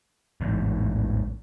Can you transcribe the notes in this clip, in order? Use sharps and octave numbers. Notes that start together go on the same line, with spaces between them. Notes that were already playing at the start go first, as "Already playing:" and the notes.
A1 E2 G#2